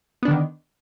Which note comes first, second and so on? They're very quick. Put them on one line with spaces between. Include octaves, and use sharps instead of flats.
B3 D4 D3 D#3